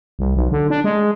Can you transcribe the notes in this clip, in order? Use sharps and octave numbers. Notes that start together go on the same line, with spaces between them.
C2
B1
D3
D4
G#3